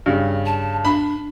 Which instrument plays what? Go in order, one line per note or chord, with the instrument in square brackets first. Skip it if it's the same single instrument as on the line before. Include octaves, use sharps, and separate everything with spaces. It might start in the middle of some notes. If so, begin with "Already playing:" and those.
[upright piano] G2 C#3
[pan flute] A5
[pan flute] D4 [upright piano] B5